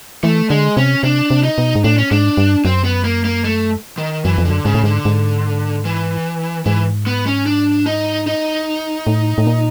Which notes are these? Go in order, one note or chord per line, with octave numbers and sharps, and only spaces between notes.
E3 A3
D3 G#3
C3 C#4
C3 D4
C3
D#4
B2
G#2
A2 D4
C#4
G#2 D4
G2
F#2 C4
B3
A#3
A#3
A3
D#3
F#2 E3
F2
F#2 D3
G#2 C#3
A2
G#2 D3
G#2
E3
G#2 E3
B3
C#4
D4
D#4
D#4
A2
A2
A#2